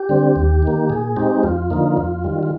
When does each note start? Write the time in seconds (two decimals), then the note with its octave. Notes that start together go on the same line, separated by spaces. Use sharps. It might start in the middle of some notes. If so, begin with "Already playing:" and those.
Already playing: G4
0.09 D3 G3 C4
0.36 D#2
0.62 D#3 A#3
0.90 A#2 G#4
1.16 G#3 C4 D#4 G4
1.43 F2 F4
1.70 D3 F3 A#3 D#4
1.97 F2
2.24 D#3 G3
2.43 F4